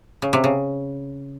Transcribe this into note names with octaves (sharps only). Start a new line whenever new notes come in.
C#3
C3
C#3